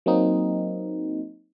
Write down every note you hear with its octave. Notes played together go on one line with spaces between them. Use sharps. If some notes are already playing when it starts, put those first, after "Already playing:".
F#3 A#3 C4 D#4